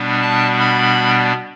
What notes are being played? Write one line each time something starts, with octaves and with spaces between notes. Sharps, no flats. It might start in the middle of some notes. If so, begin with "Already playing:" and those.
Already playing: B2 G3 B3 D4
A5
B5